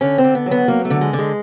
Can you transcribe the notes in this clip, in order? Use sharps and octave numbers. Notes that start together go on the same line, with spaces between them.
D3 C#4
C4
D3
B3
F#3
B3
F#3 A#3
A3
D3
G#3
D3
G#3